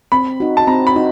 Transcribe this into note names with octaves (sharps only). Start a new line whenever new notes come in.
C4 B5
D#4 F#4
A5
C4 A#5
B5
D#4 F#4